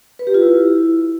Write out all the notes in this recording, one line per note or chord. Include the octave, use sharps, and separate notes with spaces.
B4
G4
F4
E4